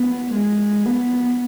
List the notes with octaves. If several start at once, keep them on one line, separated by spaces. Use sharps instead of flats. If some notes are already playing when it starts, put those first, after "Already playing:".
Already playing: B3
G#3
B3